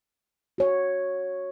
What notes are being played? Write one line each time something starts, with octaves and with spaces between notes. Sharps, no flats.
F#4 C#5